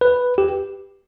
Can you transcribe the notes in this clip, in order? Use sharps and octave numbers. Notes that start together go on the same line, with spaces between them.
B4
G4